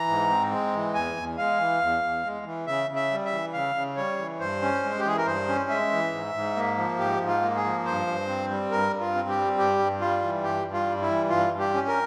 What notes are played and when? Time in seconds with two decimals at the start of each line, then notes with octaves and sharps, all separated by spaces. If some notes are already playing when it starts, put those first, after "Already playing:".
Already playing: E3 A#5
0.08 G#2
0.30 C4
0.52 G#3
0.74 E3
0.94 E2 G#5
1.16 E2
1.38 G#3 F5
1.60 E3
1.81 E2
2.03 E2
2.24 G#3
2.46 E3
2.67 C#3 E5
2.90 C#3
2.96 E5
3.11 G3
3.25 E5
3.32 E3
3.53 C#3 F5
3.75 C#3
3.97 G3 C#5
4.18 E3
4.40 G2 C5
4.62 C#4
4.84 G#3
4.99 G4
5.05 E3 G#4
5.17 A#4
5.26 G2 C5
5.48 C#4
5.70 G#3 E5
5.91 E3
6.13 G#2
6.34 G#2
6.56 A#3
6.77 F3
6.98 G#2 G4
7.21 G#2
7.27 F4
7.42 A#3
7.56 G#4
7.64 F3
7.85 G2 C5
8.07 G2
8.28 C4
8.50 G3
8.71 G2 A#4
8.93 G2
9.01 F4
9.15 C4
9.29 G4
9.37 G3
9.58 G2 G4
9.79 G2
10.00 G3 F4
10.22 E3
10.43 G2 G4
10.66 G2
10.73 F4
10.87 G3
11.02 E4
11.09 E3
11.30 G2 F4
11.52 G2
11.59 G4
11.74 C#4
11.88 A#4